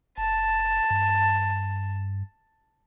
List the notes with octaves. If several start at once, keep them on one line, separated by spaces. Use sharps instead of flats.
F#1 A5
G2